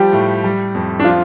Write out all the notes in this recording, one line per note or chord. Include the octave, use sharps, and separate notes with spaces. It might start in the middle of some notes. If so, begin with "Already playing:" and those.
Already playing: F3 G3 G4
A2
G3
F2
D4
F3 F4